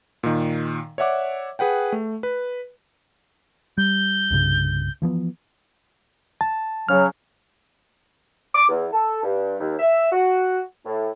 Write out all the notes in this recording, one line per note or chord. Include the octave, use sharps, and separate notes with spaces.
A#2 D#3
C#5 D5 E5 F#5 D6
G#4 B4 F#5 G5
A3
B4
G3 G6
C2 G2 C#3
E3 F3 B3
A5
C#3 F#3 F6
D6
E2
A4
G2
D#2
E5
F#4
A2